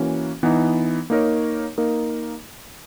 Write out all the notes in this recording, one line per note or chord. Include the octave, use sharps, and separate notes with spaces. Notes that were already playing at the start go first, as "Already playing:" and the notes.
Already playing: E3 A#3 C#4 F#4
E3 B3 D#4
A#3 D#4 A#4 C#5
A#3 D#4 A#4